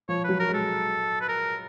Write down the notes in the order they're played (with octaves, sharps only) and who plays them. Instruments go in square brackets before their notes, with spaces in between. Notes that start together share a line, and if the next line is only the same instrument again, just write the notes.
[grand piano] F3 [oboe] C#5
[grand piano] F#3 [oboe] B4
[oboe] A#4
[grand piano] G#3
[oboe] A4
B4
A#4